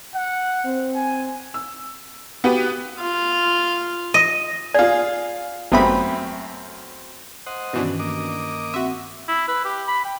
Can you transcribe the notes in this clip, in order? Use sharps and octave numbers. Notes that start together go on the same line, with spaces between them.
F#5
C4
G#5
E6
B3 F#4 G4 B4
F4 F5
D#5
F4 G#4 D5
G#1 F#2 A3 B3 C4 B5
C5 D#5 F#5
G2 B2 D#3 E3 C#4 D4
A#3 D#5 D6
C4 F#4 E5
E4
B4
G4
B5
G5